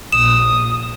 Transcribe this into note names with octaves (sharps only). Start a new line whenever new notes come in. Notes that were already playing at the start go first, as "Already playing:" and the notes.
A#1 A#2 D#6 E7